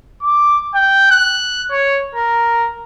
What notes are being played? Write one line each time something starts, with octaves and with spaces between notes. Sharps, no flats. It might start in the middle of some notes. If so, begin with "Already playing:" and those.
D6
G5
F#6
C#5
A#4